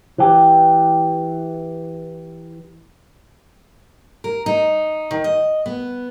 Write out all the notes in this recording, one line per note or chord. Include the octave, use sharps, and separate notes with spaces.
E3 G4
A#4
D#4
D#3
D#5
B3